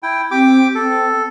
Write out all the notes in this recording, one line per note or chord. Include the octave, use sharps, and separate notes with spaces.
E4 G5
C4 G4 G5 D6
C4 A4